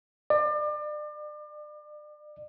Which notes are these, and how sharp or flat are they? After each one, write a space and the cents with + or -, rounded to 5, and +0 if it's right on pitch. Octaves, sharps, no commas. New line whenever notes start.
D5 +35